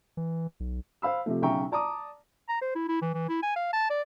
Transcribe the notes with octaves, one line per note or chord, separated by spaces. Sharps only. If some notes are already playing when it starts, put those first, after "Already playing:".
E3
B1
C5 F5 B5 E6
C3 F3 A3
B1 C#3 E5 G5 A#5 C#6
D5 A5 A#5 D6 D#6
A#5
C5
E4
E4
E3
E3
E4
G#5
F5
A5
D5